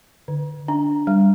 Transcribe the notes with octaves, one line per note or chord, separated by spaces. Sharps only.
D3
D4
G3